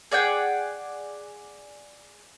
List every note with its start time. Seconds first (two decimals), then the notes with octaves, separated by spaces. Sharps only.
0.11 G#4 D5 F#5 G5